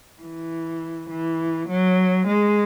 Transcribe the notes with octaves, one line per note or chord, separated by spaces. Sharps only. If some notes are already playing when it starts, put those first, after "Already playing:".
E3
E3
F#3
G#3